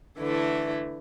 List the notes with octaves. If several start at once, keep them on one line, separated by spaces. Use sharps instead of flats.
D3 E3 A3 E4